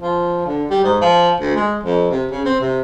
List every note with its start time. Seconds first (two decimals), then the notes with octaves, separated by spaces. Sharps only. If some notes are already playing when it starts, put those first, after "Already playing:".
0.01 F3
0.47 D3
0.70 G3
0.84 G#2
1.01 F3
1.40 D2
1.56 G#3
1.83 F2
2.11 C3
2.31 C#3
2.46 C4
2.61 C3